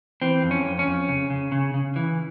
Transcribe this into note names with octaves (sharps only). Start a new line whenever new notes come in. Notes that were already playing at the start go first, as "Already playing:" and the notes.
E3 C4
F2
C#4
F2
C#4
F2
C#3
C#3
C#3
C#3
E3